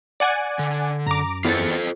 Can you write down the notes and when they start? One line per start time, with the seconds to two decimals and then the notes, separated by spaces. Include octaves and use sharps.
0.20 D5 F#5 G#5
0.59 D3
1.06 F#2 A#5 D6
1.44 E2 F4 A4 C5 A6 C#7